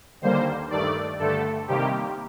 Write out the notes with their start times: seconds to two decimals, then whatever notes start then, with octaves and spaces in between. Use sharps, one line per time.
0.22 D#2 D3 G3 A#3 C5
0.71 G2 D#3 A3 D5
1.19 G2 D3 A3 A4
1.68 C3 D#3 G3 A#3 G4